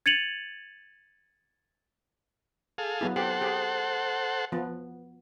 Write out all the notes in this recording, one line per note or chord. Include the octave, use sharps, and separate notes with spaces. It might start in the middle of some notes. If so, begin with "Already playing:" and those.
G#6 A6 C#7 D#7 F7 F#7
G#4 A4 F5
F#3 B3 E4
G4 A4 C5 F#5
G4 G#4
F3 B3